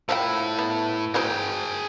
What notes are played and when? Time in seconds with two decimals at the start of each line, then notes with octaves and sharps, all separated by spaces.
0.09 A2 F3 E4 C#5 G5
0.59 B3
1.14 F#3 D#4 G#4 C5 G5